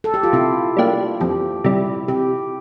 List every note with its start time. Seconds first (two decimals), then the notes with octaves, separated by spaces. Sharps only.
0.04 A4
0.14 G4
0.23 F4
0.33 C3 E4
0.77 G3 A#3 D4 G4
1.21 F2 G4
1.64 C3 G3 E4
2.08 C3 G4